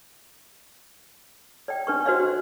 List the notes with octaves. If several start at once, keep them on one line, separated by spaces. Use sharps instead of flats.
D5 D#5 G5
D4 B4 C#6
F#4 B4 C5 D5 D#5 F5